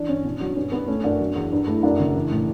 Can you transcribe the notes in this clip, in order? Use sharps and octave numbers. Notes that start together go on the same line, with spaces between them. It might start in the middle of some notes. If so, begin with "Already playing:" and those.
Already playing: E3 D4
G2 C#4
B2 D4
F#3
G2 C#4
G2 B3
A3 C#4
F#2 D4
F#3
E2
G2
A3 E4
F#2 D4
C#3
E3
A2